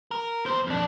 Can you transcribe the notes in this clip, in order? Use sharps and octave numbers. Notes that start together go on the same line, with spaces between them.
A#4
E2 C5
F2 D4